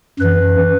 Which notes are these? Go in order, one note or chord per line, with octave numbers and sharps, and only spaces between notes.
F#2 E3 B4